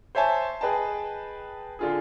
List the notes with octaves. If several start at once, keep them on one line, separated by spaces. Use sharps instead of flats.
C5 C#5 E5 G#5 A5
G#4 B4 D#5 G5 A5
D3 F4 G#4